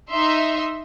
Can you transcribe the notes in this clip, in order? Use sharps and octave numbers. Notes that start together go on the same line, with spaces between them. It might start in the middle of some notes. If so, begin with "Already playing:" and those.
D#4 E5 C6